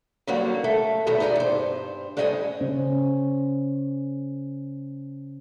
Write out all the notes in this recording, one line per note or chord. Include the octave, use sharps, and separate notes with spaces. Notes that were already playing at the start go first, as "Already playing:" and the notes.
D3 D#3 F#3 G3 A#3 F#4
A3
E2 B2 D#3 F#3 B3
D#4 E4 G#4 B4 D5
G2 C5
A2 G3 C4 D#5 E5 G#5
C#3 C#4 C5